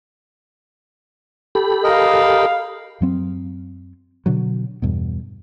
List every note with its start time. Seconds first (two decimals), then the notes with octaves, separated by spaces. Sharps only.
1.55 G4 A4 B5
1.84 A#4 D#5 F5
3.01 F#2 F#3 C4
4.26 B2 D3 F#3
4.82 E2 G2 B2